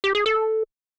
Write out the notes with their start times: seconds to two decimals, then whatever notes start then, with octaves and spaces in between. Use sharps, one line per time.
0.04 G4
0.15 G#4
0.26 A4